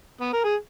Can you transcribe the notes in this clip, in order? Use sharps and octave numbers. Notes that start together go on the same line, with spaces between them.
B3
A#4
G#4